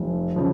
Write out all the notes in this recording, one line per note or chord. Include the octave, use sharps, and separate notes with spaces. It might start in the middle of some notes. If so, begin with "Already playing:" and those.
Already playing: F1
C#3 F3